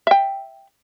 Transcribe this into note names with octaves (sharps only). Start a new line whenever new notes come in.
E5 G5